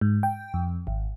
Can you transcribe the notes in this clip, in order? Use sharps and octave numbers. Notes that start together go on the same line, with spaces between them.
G#2
G5
F2
G#1